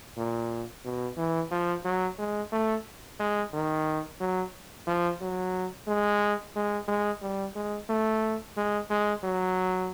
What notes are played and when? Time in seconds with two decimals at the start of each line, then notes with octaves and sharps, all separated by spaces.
0.17 A#2
0.85 B2
1.17 E3
1.51 F3
1.85 F#3
2.18 G#3
2.52 A3
3.20 G#3
3.53 D#3
4.20 F#3
4.87 F3
5.21 F#3
5.87 G#3
6.56 G#3
6.88 G#3
7.22 G3
7.55 G#3
7.89 A3
8.57 G#3
8.90 G#3
9.23 F#3